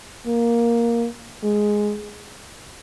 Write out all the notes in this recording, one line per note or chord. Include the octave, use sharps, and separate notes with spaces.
A#3
G#3